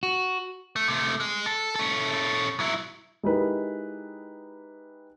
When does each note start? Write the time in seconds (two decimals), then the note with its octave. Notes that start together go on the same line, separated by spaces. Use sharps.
0.03 F#4
0.76 A3
0.88 C3 A3
1.20 G#3
1.46 A4
1.75 C#4 A4
2.60 F#3 E4
3.23 G#3 D#4 E4 G4 A#4 B4